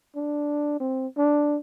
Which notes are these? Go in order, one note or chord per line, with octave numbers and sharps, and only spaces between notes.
D4
C4
D4